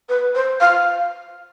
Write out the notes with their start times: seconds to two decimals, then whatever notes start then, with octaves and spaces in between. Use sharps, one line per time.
0.09 B4
0.35 C5
0.61 F5